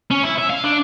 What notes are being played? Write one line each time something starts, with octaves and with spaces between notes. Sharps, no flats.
C#4
E4
E5
F5
D4